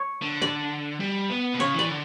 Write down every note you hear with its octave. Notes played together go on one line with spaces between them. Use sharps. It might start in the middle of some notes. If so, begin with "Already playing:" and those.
Already playing: C#5
D3
D5
G3
B3
B2
C#3 C#5
E3 D5
D3